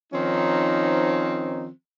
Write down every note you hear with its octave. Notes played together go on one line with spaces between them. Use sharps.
D#3 F3 C4 C#4 D#4